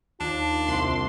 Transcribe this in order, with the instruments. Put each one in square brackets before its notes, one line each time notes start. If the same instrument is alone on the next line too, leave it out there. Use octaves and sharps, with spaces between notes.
[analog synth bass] D#2 [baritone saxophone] D4 [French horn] F4
[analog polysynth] C2 C6